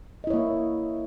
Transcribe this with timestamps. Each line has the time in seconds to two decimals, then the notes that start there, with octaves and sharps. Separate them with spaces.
0.24 D#5
0.27 E4
0.30 C#5
0.34 A#3